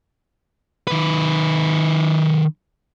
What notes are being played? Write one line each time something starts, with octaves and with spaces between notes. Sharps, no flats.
D#3 B4